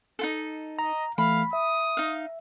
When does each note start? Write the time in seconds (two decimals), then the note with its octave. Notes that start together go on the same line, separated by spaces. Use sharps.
0.19 D#4 F4 A4
0.79 D#5 A#5
1.18 E3 A3 F5 B5
1.53 E5 D#6
1.97 D#4 F5